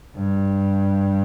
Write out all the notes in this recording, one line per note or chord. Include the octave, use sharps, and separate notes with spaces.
G2